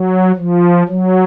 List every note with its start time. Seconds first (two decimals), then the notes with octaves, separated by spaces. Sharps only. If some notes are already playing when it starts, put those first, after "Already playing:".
Already playing: F#3
0.36 F3
0.88 F#3